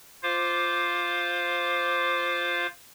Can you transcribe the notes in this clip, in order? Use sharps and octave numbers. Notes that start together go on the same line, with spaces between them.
F4 C5 F5 D6